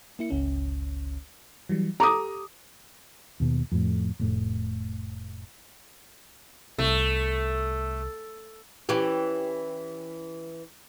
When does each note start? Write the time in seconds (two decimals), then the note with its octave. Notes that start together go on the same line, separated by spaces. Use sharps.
0.19 A#3 E4 C#7
0.30 G1 C#2 C#4
1.69 E3 F#3 G3
2.00 G4 A4 A#5 D6 D#6
3.40 D#2 B2
3.72 F2 A2
4.19 F1 A2
6.79 C2 A3
8.89 E3 C#4 G4